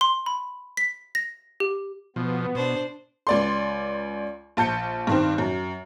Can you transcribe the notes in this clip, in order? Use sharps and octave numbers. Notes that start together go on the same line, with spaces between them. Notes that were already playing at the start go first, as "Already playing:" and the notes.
C6
B5
B6
A#6
G4
B2 F3 B3
B2 D4 C5
C#2 D5 C6
A#1 A5 G6 C#7
G2 D#3 C4
F#2